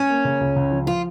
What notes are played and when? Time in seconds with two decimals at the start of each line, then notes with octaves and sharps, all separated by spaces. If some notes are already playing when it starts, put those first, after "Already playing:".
Already playing: C#4
0.09 A#3
0.25 C#3
0.41 C#2
0.56 C#2
0.71 F3
0.87 F3 F4